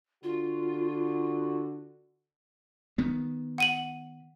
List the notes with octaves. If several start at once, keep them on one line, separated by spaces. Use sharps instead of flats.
D3 F4 F#4
D#3 B3
F#5 D#7 F#7